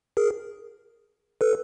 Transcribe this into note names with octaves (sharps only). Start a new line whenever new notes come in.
G#4 A#4
A4 B4